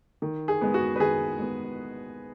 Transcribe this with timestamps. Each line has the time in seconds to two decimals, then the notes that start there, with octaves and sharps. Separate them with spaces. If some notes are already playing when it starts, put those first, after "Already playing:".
0.22 D#3
0.48 G#4
0.61 G#3 B3
0.74 F#4
0.96 B4
1.00 D#3 G#4
1.39 G#3 B3